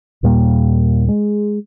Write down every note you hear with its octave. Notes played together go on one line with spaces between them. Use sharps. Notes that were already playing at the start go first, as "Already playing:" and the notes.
D#2 A#2 G3 A#3
G#3